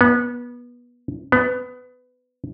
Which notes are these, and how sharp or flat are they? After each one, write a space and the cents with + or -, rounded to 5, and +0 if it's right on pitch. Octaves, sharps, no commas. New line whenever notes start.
B3 -25
B3 +20